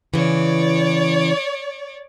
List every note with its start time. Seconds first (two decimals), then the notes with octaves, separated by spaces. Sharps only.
0.14 C#3 E3 C#5 D5